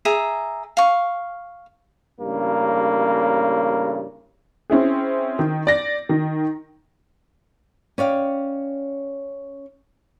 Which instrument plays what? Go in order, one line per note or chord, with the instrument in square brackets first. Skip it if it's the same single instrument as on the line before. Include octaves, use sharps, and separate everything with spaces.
[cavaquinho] G#4 E5 A#5
F5 C#6
[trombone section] A1 G2 C#3 A#3
[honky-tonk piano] C4 C#4 E4 G#4
D#3
D5 A#6
D#3
[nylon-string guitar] C#4 D5 F5 G5